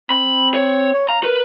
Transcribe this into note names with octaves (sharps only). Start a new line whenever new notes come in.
C4 B5
C#5
C#5
F5 A#5
A#4 B4